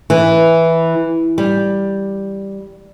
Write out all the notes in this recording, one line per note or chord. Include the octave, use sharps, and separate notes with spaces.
E3
G3